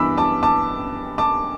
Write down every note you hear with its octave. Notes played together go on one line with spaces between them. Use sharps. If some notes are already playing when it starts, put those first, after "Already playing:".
Already playing: G2 E3 B3 B5 D6 E6
A5 D6
A5 D6
A5 D6